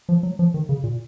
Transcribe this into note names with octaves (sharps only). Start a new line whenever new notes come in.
F3
F#3
F3
D#3
C#3
A#2